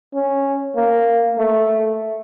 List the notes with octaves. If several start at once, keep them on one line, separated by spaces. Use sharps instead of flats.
C#4
A#3
A3